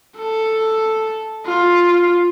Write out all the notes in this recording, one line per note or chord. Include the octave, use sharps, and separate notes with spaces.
A4
F4